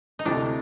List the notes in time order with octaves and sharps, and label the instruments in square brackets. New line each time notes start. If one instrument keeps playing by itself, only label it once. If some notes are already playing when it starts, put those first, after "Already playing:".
[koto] D#4
[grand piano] D2 C3 E3 [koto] D4